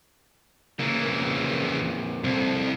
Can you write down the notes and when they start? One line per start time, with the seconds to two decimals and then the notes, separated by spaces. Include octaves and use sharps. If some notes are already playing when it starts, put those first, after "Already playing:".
0.80 C#3 E3 A#3
1.06 F2 A#3
2.24 C2 C4 A4